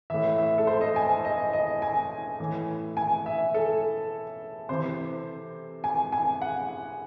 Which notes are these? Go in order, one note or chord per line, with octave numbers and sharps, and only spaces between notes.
A2 E3 E5
E5
A4
C5
D#5
G#5
D#5
D#5
G#5
A2 E3
G#5
E5
A4
C3 E3 C5
G#5
G#5
F#5